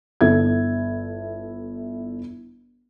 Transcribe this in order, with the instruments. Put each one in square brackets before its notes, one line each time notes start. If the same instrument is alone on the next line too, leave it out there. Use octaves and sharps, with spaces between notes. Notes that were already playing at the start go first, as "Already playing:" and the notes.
[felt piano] G1 E4 A4 E5 G#6